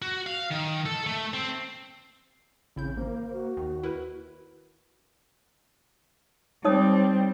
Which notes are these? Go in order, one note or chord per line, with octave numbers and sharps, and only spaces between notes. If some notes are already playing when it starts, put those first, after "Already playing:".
F#4
F5
D#3
A4
A3
C4
A1 C#3 C4 E4 G6
G#1 A#3 C5
F#4
D#2 D#3
E4 A#4 B4
G3 C4 D#4 C#5 D#6